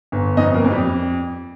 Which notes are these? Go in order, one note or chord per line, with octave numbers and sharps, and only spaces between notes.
G1
F2 D#4 D#5
A#3 A#4
F2
G3 G4